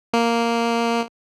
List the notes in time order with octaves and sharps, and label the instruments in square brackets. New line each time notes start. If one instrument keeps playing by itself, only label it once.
[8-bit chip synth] A#3